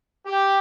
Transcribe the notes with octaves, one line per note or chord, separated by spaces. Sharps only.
G4